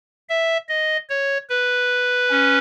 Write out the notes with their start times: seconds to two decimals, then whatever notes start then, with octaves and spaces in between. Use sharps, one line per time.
0.29 E5
0.69 D#5
1.10 C#5
1.50 B4
2.30 C#4